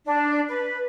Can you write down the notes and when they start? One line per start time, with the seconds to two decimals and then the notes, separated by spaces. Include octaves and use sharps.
0.06 D4
0.49 B4